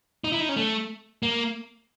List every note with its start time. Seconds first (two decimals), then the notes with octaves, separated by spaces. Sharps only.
0.24 D#4
0.32 E4
0.41 D#4
0.49 C#4
0.56 A3
1.23 A#3